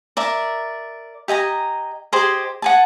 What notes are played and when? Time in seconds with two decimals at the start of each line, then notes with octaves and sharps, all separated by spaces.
0.17 A#4 D5 E5
1.28 G4 D#5 G#5 A#5
2.13 G4 G#4 C5 D#5
2.62 F#5 G#5 A5